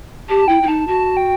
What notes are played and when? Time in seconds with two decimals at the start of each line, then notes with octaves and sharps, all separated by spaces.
0.28 G4 A5
0.39 A5
0.48 E4 G5
0.63 E4
0.67 D#4 A5
0.87 F#4 A5
1.17 G5